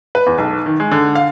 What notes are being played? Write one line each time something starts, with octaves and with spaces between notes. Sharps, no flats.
B4
E2
B1
D#3
G#3
D3
F5